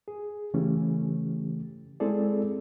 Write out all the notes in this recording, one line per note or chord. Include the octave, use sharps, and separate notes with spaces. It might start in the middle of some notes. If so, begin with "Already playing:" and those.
G#4
C#3 E3 A3 C#4 G4
G#3 C4 E4 G#4 A4 D5